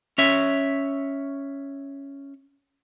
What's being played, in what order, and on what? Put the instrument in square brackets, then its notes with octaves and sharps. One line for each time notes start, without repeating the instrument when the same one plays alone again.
[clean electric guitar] C#4 C#5 E5